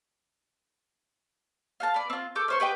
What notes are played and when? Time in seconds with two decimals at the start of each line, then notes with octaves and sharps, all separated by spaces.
1.80 F5 F#5 A5
1.94 B3 D5
2.10 C4 F4
2.35 A4 D6 G6
2.48 C#4 C5 C#6
2.60 G4 B4 D#5 G5